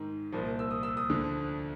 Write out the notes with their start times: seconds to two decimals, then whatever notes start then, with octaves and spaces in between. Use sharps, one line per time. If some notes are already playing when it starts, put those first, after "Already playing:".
Already playing: G#2 D#3
0.32 C2 A#2 F3
0.59 E6
0.71 D#6
0.83 E6
0.97 D#6
1.09 D2 D3 F3